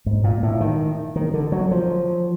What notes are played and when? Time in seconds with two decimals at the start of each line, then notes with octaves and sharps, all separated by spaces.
0.06 G#2
0.24 A#2
0.43 A2
0.61 D#3
1.16 D#3
1.34 D3
1.52 F#3
1.71 F3